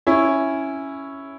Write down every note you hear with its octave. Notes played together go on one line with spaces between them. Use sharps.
C#4 E4